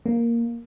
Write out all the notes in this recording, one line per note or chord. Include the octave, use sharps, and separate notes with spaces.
A#3